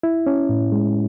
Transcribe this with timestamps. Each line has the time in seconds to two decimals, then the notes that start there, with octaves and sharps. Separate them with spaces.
0.03 E4
0.27 C#4
0.49 A2
0.72 G#3